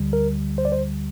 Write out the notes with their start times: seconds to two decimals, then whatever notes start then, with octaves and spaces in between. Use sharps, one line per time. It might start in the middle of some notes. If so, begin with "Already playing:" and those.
Already playing: D2 D3 G3
0.13 A#4
0.58 C5
0.65 D5
0.72 C5